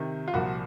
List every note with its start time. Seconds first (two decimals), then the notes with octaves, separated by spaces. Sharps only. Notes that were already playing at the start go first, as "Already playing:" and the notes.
Already playing: C3 D#3
0.28 F4
0.33 C2 A#2 F3 F#4